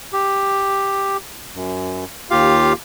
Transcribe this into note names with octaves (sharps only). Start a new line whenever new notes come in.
G4
F#2
D#2 F4 G4 F5